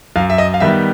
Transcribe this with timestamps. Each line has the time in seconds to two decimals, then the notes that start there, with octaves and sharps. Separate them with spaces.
0.16 F#2 F5
0.30 E5
0.38 D#5
0.54 F5
0.60 D#3 G3 B3 E5